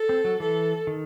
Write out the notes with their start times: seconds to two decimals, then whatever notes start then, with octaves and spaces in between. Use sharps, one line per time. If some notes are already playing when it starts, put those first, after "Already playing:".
Already playing: A4
0.09 C4
0.24 F#3
0.40 E3 A4
0.87 D#3